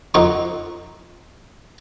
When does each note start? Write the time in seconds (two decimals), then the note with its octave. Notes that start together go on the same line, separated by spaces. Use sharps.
0.14 F2 D#4 C#6